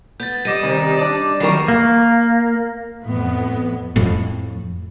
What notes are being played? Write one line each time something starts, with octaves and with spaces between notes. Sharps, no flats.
B3 G6 A6
G3 D#5 D6 A#6 D#7
C3 D#3
D4 D5
D#3 F#3 C4 A#4 C#6 D6 C7
A#3
F2 A2 B3
F2 A2